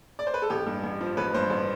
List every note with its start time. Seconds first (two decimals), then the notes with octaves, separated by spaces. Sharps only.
0.19 D5
0.27 C5
0.34 B4
0.42 A4
0.50 A1 G4
0.66 G2
0.84 A1
1.01 F3
1.17 A1 B4
1.34 G2 C5
1.50 A1